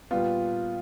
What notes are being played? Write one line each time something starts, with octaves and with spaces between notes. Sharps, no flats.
A#2 G3 B3 F4